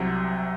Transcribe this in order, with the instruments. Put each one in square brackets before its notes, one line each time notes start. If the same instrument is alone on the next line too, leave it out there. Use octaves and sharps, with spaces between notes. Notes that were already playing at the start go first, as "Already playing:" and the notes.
Already playing: [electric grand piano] C2 C3 F#3